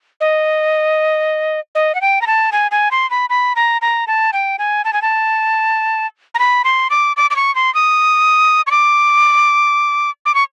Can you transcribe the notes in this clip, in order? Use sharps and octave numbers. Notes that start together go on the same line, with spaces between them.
D#5
D#5
F#5
G5
A#5
A5
G#5
G#5
C6
B5
B5
A#5
A#5
A5
G5
G#5
A5
G#5
A5
A#5
B5
C6
D6
D6
D6
C#6
C6
D#6
C#6
D6
D6
C#6